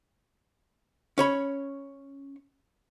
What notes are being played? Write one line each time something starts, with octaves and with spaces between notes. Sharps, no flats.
C#4 C#5 B5